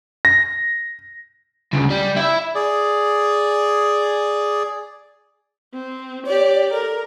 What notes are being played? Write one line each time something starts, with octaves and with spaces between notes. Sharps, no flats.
A#6
D2 C#3
G3
E4 E5
G#4 D5
C4
G4 C#5 D5
A4 A#4